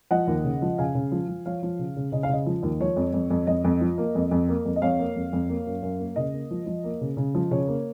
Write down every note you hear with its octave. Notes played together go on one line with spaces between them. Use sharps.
F3 D#5 F#5
D#2
C#3
F3
C#3 F5 G#5
C#3
F3
F3
F3 C#5 F5
F3
C#3
C#3
C#3 D#5
F5
C#3 D#5
F3
D#2
F3 C#5
F2
F2
F2
F2 D#5
F2
F3
A#3
F2
F2
A#3
F2
D#5
F2 C#5 F5
A#3
F2
F2
A#3
F#2
F#2
A#3
C#3 D#5
A#3
F3
F3
A#3
C#3
C#3
F3
C#3 C#5
A#3